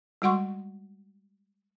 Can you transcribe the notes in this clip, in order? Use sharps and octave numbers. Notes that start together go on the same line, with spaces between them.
G3 G#3 F#4 F#5 C6 C#6